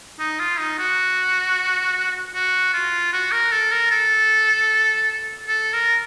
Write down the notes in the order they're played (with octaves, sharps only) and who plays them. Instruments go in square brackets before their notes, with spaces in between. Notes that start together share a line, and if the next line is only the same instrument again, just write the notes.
[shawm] D#4
F4
D#4
F#4
F#4
F4
F#4
A#4
A4
A#4
A4
A4
A#4